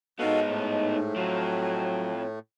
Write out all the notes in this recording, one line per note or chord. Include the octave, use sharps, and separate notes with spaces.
G#2 B3 D#4 F#4 A4 D#5 F5
A2 A3
F3 F#3 C4 C#5